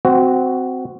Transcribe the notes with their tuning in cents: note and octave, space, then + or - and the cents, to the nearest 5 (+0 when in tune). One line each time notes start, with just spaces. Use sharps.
C4 -15 F#4 +5